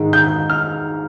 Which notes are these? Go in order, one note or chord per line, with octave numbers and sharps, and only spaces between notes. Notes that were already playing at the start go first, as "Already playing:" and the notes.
Already playing: G#2 D#3 G#3
G6
F6